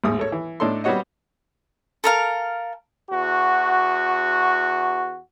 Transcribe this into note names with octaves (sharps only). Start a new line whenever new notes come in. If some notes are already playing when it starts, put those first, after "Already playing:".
A1 D#2 G#2 D#6
A4 C#5
E3
A2 D4 D#4 A4 C#5 C6
G3 B3 C4 F#4 C#5 D#5
A4 A#4 F5
E2 F#4